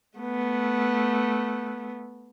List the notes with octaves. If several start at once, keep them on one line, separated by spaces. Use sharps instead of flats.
A3 B3